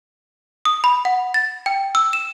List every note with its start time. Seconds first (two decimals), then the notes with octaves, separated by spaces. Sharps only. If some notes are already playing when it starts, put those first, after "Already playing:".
0.65 D#6
0.84 B5
1.05 F#5
1.34 A6
1.66 G5
1.95 E6
2.13 E7